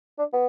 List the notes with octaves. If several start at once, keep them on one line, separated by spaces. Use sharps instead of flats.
D4
B3